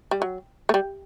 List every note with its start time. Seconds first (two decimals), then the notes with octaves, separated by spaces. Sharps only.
0.11 G3
0.22 F#3
0.69 A3
0.74 G3